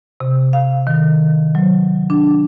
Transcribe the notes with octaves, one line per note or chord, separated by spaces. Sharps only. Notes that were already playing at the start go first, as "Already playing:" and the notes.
C3
F5
D#3
F#3
D4